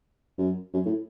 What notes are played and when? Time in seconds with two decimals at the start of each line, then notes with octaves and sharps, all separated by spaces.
0.38 F#2
0.74 F#2
0.86 A2